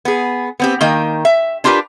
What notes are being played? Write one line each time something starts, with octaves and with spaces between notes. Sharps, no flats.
B3 G#4
B3 C4 G4
D#3 A#3 D#5 G5
E5
D4 F4 G4 A#4 B4